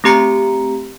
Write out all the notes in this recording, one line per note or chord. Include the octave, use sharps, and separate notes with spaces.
A3 C4 G4 A#5 C#7